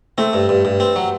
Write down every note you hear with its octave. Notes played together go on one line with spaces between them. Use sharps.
A3 C4
G2
G2
G2
C4
F#3